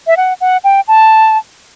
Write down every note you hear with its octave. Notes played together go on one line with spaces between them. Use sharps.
E5
F#5
F#5
G5
A5